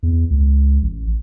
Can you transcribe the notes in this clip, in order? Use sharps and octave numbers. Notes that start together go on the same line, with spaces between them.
E2
C#2
A1